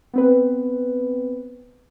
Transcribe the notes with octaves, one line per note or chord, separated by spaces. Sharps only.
B3 C4 B4